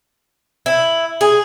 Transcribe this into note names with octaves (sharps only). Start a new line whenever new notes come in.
E4
G#4